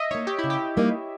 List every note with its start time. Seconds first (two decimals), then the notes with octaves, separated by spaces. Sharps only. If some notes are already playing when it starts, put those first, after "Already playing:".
Already playing: D#5 E5
0.11 A#3 D#4 C#5
0.27 G4
0.39 E4
0.44 C#3
0.50 G4
0.77 G3 A#3 D#4